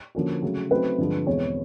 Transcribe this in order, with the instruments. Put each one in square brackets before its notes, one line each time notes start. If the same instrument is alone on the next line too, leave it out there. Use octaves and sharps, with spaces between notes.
[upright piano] D3 F3 A#3 C#4 F#4
C#3 F#3 A3
[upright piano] C#3 F#3 A3 C4 D#4 [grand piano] B4
[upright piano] G2 D3 F3 G#3
[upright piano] E2 B2 G#3 C4 [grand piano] C#5